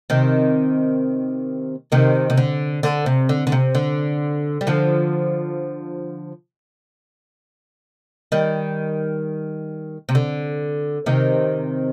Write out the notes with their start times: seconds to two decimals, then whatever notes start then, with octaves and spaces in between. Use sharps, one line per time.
0.10 C3 D#3
1.92 C3 D#3
2.30 C3
2.38 D3
2.83 D3
3.06 C3
3.29 D3
3.47 D3
3.52 C3
3.75 D3
4.61 G3
4.67 D3 F3
8.32 D#3 G3
10.09 C3
10.15 D3
11.06 C3 D#3